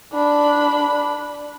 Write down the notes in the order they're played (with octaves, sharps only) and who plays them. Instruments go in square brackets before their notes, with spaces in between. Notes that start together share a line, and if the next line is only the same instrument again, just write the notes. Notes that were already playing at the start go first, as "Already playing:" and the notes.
[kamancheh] D4 B5